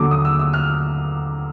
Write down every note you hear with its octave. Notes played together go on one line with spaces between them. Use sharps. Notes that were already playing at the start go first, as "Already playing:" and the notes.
Already playing: D#2 D3 F#3 D6
D#6
E6
E6
F6